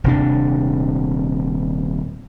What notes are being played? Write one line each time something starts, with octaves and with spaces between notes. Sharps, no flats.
D#1 C3 D4